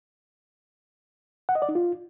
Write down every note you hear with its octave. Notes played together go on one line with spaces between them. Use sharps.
F#5
D#5
D5
D#4
F4